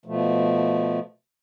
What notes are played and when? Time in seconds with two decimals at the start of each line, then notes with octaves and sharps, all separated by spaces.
0.06 B2 F3 A3